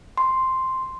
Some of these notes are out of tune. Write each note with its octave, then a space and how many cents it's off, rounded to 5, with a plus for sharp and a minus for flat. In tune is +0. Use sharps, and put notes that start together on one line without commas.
C6 +0